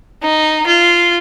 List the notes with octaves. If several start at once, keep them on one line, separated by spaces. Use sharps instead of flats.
D#4
F4